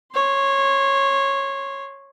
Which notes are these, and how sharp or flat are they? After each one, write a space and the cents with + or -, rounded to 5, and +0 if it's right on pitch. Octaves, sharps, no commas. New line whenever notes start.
C#5 -15 C6 +0